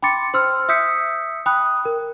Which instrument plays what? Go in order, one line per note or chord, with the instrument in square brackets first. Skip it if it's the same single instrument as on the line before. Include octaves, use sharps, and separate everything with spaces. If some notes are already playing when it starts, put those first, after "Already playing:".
[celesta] G5 B5 C6 D6 A6 C#7
C5 C6 E6 F6
E5 D#6 E6 G6 B6 C#7
G5 B5 D#6 F#6
A#4